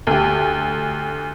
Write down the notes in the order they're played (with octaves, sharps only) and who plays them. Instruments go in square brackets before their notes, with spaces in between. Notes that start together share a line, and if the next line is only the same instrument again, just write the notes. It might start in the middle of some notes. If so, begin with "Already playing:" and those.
[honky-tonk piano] D2 G4